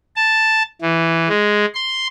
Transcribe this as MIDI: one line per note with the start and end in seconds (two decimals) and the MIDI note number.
0.16 0.63 81
0.82 1.28 52
1.28 1.65 56
1.75 2.07 84